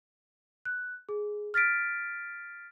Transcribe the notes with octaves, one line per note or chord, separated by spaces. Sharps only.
F#6
G#4
F6 A6 B6 D7